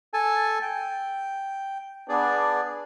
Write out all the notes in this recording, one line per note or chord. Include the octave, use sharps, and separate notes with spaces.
A4 G#5 A5
G5
B3 D4 G#4 D5